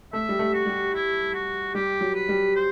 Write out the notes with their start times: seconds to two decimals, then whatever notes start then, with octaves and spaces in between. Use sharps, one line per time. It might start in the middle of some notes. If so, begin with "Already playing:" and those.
0.13 A3 E5
0.29 G3
0.39 A3
0.53 F#4
0.66 G3
0.94 E4
1.34 F#4
1.74 G3 G4
2.01 F#3
2.15 B4
2.29 G3
2.56 C5